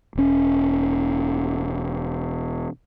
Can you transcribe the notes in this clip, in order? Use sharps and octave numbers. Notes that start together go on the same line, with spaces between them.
E1 C#4